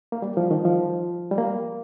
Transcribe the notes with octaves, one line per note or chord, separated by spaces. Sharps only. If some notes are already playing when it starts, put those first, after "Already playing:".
A#3
G3
F3
D#3
F3
G3
A#3